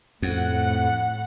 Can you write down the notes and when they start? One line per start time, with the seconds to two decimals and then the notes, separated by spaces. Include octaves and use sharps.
0.22 F2 A2 F#5